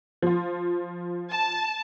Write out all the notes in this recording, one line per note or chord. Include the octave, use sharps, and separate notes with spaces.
F3 F4
A5